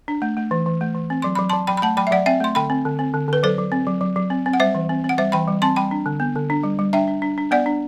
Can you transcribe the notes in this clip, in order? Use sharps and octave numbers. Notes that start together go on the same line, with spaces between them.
D4
A3
A3
E3
E3
A3
E3
C4
F#3 C6
F#3 B5
F#3 A5 C6
F#3 G5 B5
B5
A3 F#5 A5
F#3 G5 B5
E5
F#3 D5 F#5
C4 E5 G5
A3 C6
D3 G5 B5
C4
D3
C4
D3
D3 B4
F#3 A4 C5
F#3
C4
F#3
F#3
F#3
C4
C4
F#5
G3 C5 E5
E3
C4
C4
F#5
G3 C5 E5
E3 G5 B5
G3
C4 A5 C6
G3 G5 B5
D4
D3
B3
D3
D4
G3
G3
D4 E5 G5
D4
D4
D4
B3 D5 F#5
D4